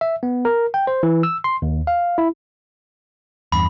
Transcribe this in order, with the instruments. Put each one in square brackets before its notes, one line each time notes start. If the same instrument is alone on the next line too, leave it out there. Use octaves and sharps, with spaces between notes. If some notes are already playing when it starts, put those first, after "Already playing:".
[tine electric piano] E5
B3
A#4
G5
C5
E3
E6
C6
D#2
F5
E4
[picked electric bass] E2 G2 [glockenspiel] B5